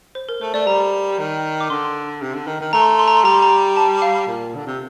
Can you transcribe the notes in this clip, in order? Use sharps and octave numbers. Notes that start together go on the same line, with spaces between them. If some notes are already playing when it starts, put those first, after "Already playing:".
C5
A#4
A3 C5
A3 D5
G3 A#5
D#3
D6
D3 C6
C3
D3
D#3
D#3
A3 A#5
C6
A#5
C6
A#5
C6
G3 A#5
C6
A#5
A5
F5
A#2
D3
C3